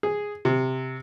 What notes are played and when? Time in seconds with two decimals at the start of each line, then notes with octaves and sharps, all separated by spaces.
0.03 G#4
0.45 C3